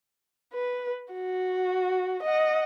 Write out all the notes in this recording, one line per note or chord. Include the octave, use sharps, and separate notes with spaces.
B4
F#4
D#5 F#5